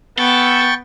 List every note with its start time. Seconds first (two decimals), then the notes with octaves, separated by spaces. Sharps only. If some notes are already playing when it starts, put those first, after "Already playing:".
0.18 B3 A4 G5 C#6 A6